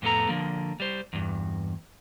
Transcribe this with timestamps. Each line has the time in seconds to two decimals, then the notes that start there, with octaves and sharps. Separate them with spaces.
0.02 F2 A2 B3 A4 A#5
0.29 D3 F3 A#3
0.80 G3 C5
1.13 E2 G2